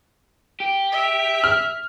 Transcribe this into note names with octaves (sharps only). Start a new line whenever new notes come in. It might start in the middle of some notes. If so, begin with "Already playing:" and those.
G4
E5
F6